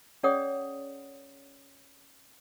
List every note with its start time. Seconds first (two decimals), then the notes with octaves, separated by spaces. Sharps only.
0.23 C#4 G#4 C#5 D5 F#5 D#6